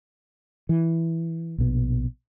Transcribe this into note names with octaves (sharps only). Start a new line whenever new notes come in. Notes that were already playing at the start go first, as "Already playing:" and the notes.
E3
A#1 B2